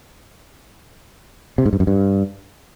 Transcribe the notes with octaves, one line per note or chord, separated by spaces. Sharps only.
C3
G#2
G2
F#2
G2